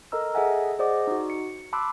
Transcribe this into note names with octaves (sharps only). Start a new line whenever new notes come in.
A4 A#4 D#5 A#5 E6
G#4 A4 D#5 E5 F#5 G#5
G#4 C5 D5 D#5 F#5 D6
D#4 F#4
C#7
A5 B5 C6 D6 E6 F#6